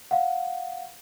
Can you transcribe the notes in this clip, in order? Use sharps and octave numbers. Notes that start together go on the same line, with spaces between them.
F5 F#5